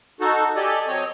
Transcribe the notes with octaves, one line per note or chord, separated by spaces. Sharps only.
D#4 F#4 A4
G4 A4 D5 D#5 G#5
F#3 C4 C#5 D#5